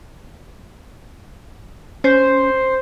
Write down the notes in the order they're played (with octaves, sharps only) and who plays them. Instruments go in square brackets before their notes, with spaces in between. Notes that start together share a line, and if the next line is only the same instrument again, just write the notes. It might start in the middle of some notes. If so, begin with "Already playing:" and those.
[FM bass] C#4 [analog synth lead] C5